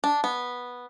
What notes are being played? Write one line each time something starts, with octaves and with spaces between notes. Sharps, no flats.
D4
B3